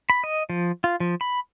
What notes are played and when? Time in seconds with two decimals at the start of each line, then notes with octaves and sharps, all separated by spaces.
0.10 B5
0.24 D#5
0.50 F3
0.84 F4
1.00 F3
1.21 B5